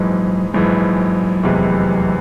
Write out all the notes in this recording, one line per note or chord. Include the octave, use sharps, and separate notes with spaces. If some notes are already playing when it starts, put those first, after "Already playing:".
Already playing: A#1 G#2 E3 F#3 G#3
A#1 G#2 E3 F#3 G#3
F1 E2 C3 E3 G#3